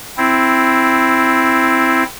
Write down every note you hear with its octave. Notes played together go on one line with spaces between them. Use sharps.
C4 E4